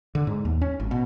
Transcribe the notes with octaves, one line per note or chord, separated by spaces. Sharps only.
D3
G#2
D#2
C#4
G#1
B2